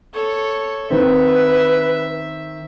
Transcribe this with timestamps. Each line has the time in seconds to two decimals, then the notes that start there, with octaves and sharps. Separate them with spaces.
0.13 A4 C#5
0.90 D#3 C4 B4 E5